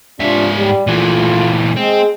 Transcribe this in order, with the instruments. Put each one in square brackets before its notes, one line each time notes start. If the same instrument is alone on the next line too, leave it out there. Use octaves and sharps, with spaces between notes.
[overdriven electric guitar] G#2 E5 [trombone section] C3 D4 F4
[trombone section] G3
[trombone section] A#1 A3 F4 [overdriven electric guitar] A#2 E3
[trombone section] G#3 [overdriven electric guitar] C4